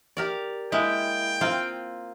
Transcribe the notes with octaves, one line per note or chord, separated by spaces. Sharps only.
G4 A#4 D5
G#3 A#3 E4 G5
A#3 C4 F4